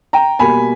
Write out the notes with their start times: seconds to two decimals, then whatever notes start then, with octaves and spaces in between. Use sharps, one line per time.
0.13 G5 A#5
0.39 B2 G3 A#3 G#5 B5